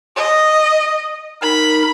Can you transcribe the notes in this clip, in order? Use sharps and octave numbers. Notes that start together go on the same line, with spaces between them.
D#5
D#4 A#4 B5